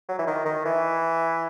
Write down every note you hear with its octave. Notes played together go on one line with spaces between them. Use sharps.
F#3
E3
D#3
D#3
E3